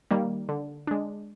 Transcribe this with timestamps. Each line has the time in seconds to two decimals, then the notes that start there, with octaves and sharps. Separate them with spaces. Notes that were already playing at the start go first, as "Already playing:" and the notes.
0.11 D#3 G3 A#3
0.49 D3
0.87 G#3 D4